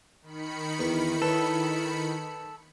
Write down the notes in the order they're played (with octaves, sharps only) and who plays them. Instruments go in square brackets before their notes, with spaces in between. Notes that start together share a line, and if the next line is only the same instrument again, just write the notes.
[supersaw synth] D#3 B5 C#7
[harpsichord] E2 C#6 [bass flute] E4
[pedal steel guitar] A4 [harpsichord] B4 C#5